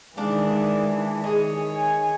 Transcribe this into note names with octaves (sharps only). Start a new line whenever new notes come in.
D#3 E3 G#3 D4 F5
D#3 G#4 C#5 D#5
G#5